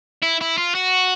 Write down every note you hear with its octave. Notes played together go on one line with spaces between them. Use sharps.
E4
E4
F4
F#4